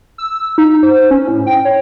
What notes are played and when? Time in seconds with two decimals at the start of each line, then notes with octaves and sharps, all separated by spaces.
0.18 E6
0.58 D#4
0.83 C5
1.11 C#4
1.28 A2
1.47 G5
1.65 C#5